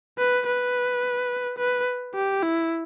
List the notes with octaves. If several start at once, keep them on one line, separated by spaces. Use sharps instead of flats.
B4
B4
B4
G4
E4